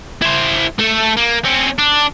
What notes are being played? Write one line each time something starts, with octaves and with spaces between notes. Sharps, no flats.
E4 C5
A3 A4
A#3
C4 C#4
D4